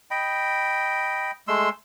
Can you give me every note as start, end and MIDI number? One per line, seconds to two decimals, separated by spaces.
0.11 1.31 75
0.11 1.31 79
0.11 1.31 83
1.48 1.69 56
1.48 1.69 57
1.48 1.69 84
1.48 1.69 88